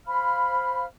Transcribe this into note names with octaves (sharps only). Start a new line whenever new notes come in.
C5 F5 B5 F6